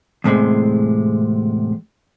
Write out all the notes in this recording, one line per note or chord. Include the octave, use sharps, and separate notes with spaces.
E2 A2 C3 G#3